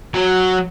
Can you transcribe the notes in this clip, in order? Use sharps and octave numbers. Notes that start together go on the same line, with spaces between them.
F#3